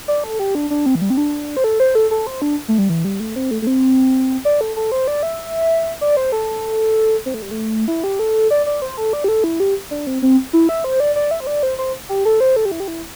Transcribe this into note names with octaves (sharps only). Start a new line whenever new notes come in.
D5
A4
G4
D4
D4
C4
E3
G3
C4
D4
C5
A4
C5
A4
A4
C5
D4
A3
G3
E3
G3
A3
C4
A3
A3
C4
D5
A4
A4
C5
D5
E5
D5
C5
A4
C4
A3
G3
A3
E4
G4
A4
D5
D5
C5
A4
D5
G4
A4
E4
G4
D4
C4
C4
E4
E5
C5
D5
D5
E5
C5
D5
C5
C5
G4
A4
C5
A4
G4
E4
G4
E4